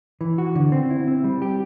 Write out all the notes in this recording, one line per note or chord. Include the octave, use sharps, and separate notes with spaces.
E3
F#4
D3
C4
E4
C4
G3
G4